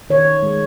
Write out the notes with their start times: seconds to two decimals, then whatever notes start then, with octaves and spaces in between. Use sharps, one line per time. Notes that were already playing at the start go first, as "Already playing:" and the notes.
0.10 D#3 C#5
0.43 G#3